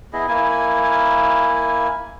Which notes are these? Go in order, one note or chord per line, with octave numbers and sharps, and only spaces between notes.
B3 E4 G#4 D#5
A#3 E4 G#5